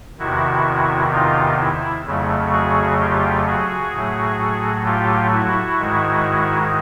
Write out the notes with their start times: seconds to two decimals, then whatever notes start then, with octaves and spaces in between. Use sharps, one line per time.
0.19 E2 C3 D#3 E4 F#4
1.12 D#4 F4
1.59 E4
2.05 F2 C#3 F#3 A3
2.52 F#4 G#4
2.99 F4 G4
3.45 F#4 G#4
3.92 A2 F#3 A3
4.85 F4 G4
5.32 E4 F#4
5.79 G#2 D#3 G#3